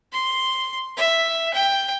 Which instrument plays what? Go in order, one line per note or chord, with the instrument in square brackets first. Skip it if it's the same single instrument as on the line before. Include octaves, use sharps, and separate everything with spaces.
[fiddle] C6
E5
G5